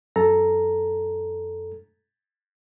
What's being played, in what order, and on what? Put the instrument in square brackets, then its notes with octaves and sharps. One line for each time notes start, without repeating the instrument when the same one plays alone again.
[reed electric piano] F#2 A4 A#5